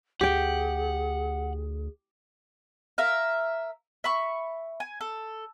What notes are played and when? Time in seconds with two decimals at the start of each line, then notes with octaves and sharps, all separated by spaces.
0.21 D2 G4 G#4 F#5 G5
2.98 A#4 E5 F5
4.04 E5 B5 C#6
4.80 G#5
5.01 A4